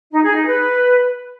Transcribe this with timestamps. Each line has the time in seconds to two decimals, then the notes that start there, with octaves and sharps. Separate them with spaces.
0.11 D#4
0.22 G#4
0.34 D#4
0.45 B4